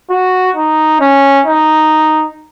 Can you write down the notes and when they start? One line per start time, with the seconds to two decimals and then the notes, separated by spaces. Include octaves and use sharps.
0.10 F#4
0.56 D#4
1.01 C#4
1.46 D#4